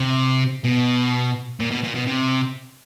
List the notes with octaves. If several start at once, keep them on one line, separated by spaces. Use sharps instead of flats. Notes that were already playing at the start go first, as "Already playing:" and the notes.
Already playing: C3
B2
A#2
B2
A#2
B2
C3